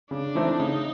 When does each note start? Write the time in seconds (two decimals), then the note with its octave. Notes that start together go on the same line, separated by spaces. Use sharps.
0.11 C#3 D4
0.35 E3 A3 C4 D#4
0.59 C#3 D#4